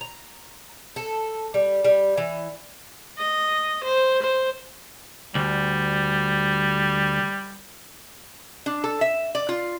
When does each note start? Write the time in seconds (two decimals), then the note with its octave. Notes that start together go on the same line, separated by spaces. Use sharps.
0.01 A#5
0.96 A4
1.54 G3
1.84 G3
2.17 E3
3.18 D#5
3.84 C5
4.22 C5
5.35 D2 G3
8.66 D4
8.84 A4
9.01 E5
9.35 D5
9.49 F4